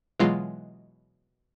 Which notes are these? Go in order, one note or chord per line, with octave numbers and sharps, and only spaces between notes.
B2 E3 F#3 G#3 F4